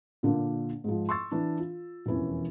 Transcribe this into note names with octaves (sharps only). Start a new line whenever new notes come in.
A#2 D3 A#3
G#2 F3
C6 C#6 E6 A6
E3 D4
F4
E1 F2 E3 C#4